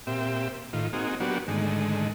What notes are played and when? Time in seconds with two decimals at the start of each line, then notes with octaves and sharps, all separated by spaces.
0.07 A#2 C4 G4 E5
0.73 A2 D#3 F4
0.93 A#3 C4 D#4 F#4 G#4
1.20 F#3 A#3 B3 D4 F#4 G4
1.48 G#2 D3 D#3 G#3 A3